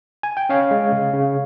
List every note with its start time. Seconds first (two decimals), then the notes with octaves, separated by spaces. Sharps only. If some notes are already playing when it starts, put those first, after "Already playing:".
0.23 G#5
0.37 G5
0.49 C#4 C#5 F5
0.71 G#3
0.92 C#3
1.13 C#3